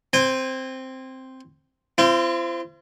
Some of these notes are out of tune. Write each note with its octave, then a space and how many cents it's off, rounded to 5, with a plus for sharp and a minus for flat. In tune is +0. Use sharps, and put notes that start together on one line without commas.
C4 +0 G#5 -35
C4 -10 F4 -45